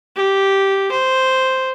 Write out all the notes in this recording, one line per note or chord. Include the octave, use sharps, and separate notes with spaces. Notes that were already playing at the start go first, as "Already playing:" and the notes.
G4
C5